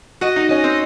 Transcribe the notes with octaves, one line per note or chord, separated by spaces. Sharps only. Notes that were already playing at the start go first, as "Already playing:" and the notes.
F#4 D#5
D#4
C#4 D#5
C4